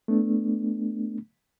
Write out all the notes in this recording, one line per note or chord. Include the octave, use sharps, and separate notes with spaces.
A3 B3 D4